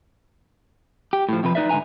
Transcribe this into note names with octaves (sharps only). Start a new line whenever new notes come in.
G4
A2 F3
F2 C3 F3 B4
D#4 B4 D5 E5
G#2 D3 B4 G#5 A#5